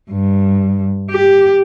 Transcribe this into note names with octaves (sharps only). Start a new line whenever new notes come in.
G2
G4